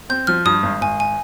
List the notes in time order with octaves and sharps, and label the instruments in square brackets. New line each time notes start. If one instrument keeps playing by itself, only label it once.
[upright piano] C4 [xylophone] G6
[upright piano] F3 [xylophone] F6
[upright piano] G2 [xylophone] D#6
[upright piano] G#1
[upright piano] G#1 [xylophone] G#5
[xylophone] G#5